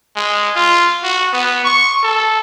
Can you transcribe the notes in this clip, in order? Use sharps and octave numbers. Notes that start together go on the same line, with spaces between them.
G#3
F4
F#4
B3
C#6
A4